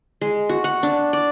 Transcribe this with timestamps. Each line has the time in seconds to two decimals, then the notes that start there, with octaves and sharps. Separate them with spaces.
0.21 G#3
0.49 F#4
0.64 F#5
0.83 D4
1.13 D5